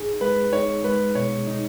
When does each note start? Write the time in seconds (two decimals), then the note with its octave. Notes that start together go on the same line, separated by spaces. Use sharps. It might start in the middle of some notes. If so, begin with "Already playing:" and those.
Already playing: D#4 G#4
0.21 G#3 B4
0.53 D#4 C#5
0.84 G#3 B4
1.15 B2 C#5
1.47 D#4